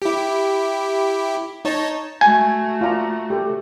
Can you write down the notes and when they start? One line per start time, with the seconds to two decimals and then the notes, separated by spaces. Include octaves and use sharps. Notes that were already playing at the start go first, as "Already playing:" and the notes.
0.02 E4 G4
1.65 D#4 C#5 A5
2.21 A3 F#4 G#5
2.81 F4 D5 A#5
3.30 G4 A4